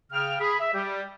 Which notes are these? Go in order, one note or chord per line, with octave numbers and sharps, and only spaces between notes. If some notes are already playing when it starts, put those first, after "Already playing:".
C#3 G5 F6
G#4 B5
E5
G3 G4